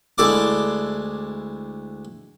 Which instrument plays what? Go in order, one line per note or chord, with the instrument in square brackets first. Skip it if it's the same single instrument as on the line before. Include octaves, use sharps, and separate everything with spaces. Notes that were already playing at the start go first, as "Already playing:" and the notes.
[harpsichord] D2 G#3 E4 D5 D6